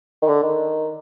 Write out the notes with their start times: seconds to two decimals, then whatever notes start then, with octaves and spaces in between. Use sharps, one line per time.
0.22 D#3
0.28 D3
0.43 D#3